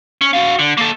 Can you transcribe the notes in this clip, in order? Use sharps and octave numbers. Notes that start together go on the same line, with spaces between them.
C#4
F#4 F5
D3
A#3 A4